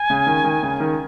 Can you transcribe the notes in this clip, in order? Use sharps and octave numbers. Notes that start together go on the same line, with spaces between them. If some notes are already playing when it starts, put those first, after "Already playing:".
Already playing: G#5
C#3
D#3
D#3
C#3
D#3